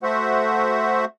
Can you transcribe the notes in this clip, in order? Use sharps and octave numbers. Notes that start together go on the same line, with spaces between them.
A3 F#4 C5 E5 F#5